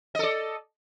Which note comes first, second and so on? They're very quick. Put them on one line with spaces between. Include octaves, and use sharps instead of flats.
D#5 A4 D5